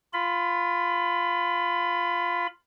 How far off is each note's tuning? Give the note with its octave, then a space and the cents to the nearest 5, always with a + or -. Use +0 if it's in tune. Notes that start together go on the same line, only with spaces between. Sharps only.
F4 +0 B5 +20